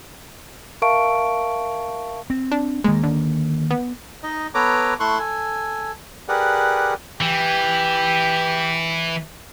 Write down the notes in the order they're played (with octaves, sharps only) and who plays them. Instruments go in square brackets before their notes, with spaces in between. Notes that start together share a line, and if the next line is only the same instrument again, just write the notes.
[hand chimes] A#4 E5 F5 A5 C#6 D7
[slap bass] C4
[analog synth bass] D4
[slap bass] D#3 A#3 [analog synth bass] G#3
[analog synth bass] D3
B3
[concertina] D#4 D#5
B3 A4 B4 C#5 A#5 D6
A3 E4 A4 C6 C#6 F#6
A4 G#5
G4 G#4 A#4 B4 D5 F#5
[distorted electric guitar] E3 [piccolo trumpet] G4